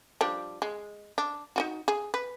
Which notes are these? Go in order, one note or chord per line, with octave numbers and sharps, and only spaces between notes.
F3 G3 D4
G#3
D4
D#4 F4 F#4
G#4
B4